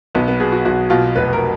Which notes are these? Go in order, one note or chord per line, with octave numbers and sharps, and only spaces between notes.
B1 B3
B3
B2 G#4
F#4
B1 F#4
B2 F4
F1 B4
A#4